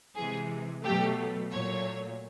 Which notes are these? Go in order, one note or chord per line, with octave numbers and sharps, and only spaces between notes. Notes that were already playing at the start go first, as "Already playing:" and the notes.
C3 E3 G#3 G#4
B2 F#3 A3 G4
A#2 F#3 A3 C#5